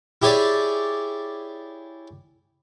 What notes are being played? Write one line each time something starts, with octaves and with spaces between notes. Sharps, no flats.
E4 G4 G#4 C#5 D5